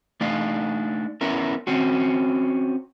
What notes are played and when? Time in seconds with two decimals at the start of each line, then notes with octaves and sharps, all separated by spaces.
0.21 A3 D4 D#4 D5 F5
1.21 B3 C#4 E4 A#4
1.67 C4 C#4 F#4